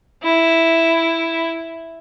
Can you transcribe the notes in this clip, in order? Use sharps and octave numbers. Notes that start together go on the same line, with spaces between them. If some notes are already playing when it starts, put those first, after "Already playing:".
E4